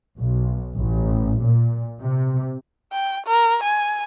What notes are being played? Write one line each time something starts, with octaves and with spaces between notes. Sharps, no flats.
B1
A1
A#2
C3
G5
A#4
G#5